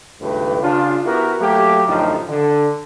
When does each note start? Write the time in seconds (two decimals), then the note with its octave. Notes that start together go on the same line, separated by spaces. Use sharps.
0.21 G#1 C#2 G2 A3 G4 B4
0.62 C#3 D4 F4
1.05 B3 E4 F#4 G4 A#4
1.40 F#3 A3 A#3 G4
1.87 F#2 A2 D3 F3 C#4 D#4
2.29 D3